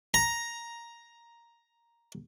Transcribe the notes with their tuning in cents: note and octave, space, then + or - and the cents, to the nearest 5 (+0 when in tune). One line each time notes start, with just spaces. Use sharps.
A#5 +5